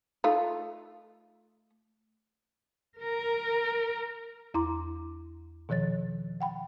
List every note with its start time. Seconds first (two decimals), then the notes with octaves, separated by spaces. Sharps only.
0.24 A3 D#4 F4
3.00 A#4
4.54 E2 E4 A#5 C6 D6
5.69 B2 D#3 F3 C#5 A6
6.41 F#5 G5 B5